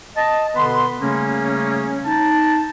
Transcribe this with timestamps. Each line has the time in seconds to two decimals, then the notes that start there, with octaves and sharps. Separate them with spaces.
0.17 D#5 A5
0.55 B2 D3 B3 B4 C6
0.99 C#3 G3 A3 A#3 C#4
2.05 D#4 A5